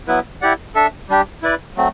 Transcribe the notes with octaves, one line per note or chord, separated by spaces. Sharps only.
F#3 B3 E4 B4
E4 G4 D5 F#5
D4 A4 E5
G3 D4 G4
E4 B4 D5
F#3 A3 C4